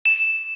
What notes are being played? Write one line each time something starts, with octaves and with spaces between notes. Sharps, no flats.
E7